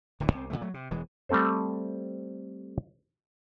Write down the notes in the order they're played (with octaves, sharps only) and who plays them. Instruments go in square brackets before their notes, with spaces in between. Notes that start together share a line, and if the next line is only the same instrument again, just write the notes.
[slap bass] D1 D3 E3
C2 G3 C4
A#2 D3 E3 A3
F#3 A3
C3
E1 E3 G#3
[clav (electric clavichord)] G3 A3 C4 A4 C5